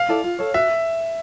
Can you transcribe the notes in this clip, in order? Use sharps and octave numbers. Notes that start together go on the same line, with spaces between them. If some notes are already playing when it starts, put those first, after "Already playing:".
Already playing: F5
E4 A4 D5
F4
A4 C#5
F#4 E5